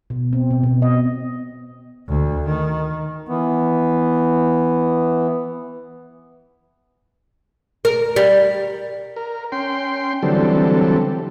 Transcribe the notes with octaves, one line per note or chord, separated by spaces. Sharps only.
B2
C4
B2
B2
D#5
D2
D#3
E3 B3
A#4
G3
A#4
C#4 G5 C6
D3 E3 F#3 G3 C4 A4